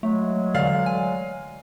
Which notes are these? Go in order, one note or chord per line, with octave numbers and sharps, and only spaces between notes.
F#3 G#3 A3
D3 E3 D5 F5
G#5